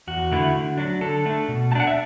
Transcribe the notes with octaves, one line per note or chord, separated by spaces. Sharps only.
E2 F#4
D3 A3 E4
D3
F#3 D4
D3 A4
A3 D4
B2
A3 A5
D4 F#5
E5